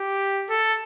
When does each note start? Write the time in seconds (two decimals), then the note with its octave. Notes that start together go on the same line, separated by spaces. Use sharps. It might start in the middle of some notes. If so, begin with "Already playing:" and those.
Already playing: G4
0.50 A4